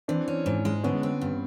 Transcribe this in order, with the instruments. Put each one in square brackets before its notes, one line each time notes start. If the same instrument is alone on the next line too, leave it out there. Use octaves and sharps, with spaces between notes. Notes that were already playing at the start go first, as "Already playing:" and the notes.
[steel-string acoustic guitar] E3 [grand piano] C4 D4
[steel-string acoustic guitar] C#4
G#2
G#3
[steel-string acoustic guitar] D3 [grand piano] B3 C#4
[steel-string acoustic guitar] C4
G2